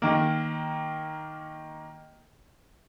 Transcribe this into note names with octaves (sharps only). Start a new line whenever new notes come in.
D#3 A#3